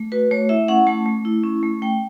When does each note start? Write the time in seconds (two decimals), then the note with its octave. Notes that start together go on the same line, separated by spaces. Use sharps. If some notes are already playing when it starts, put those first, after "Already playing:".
Already playing: A3
0.12 F#4 B4
0.31 A3 C#5
0.49 E4 E5
0.68 C#4 F#5
0.87 A3 A5
1.06 A3
1.25 E4
1.44 C#4
1.63 A3
1.82 A3 G5